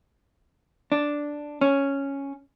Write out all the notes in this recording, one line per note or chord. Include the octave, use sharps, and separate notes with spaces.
D4
C#4